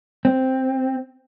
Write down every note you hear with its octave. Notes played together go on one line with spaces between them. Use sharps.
C4